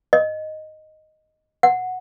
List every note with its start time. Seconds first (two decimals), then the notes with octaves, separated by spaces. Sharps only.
0.13 D#5
1.63 F#5